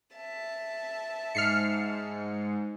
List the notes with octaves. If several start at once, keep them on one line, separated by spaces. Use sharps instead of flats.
E5 A5
G#2 F6 C7 C#7